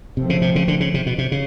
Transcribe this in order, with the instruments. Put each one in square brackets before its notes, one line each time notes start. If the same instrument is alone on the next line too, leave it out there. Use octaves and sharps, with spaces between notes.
[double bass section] G#2 F3 A3 C4 [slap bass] C3
[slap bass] C#3
C3
C#3
D3
C#3
C3
B2
C3
C#3